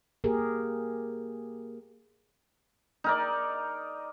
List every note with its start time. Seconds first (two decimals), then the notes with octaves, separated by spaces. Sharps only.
0.24 A#3 G4 G#4 A#4
3.04 D#4 A#4 D5